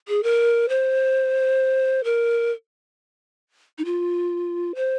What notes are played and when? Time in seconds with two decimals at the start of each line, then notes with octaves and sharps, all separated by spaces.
0.08 G#4
0.23 A#4
0.69 C5
2.04 A#4
3.78 D#4
3.85 F4
4.75 C5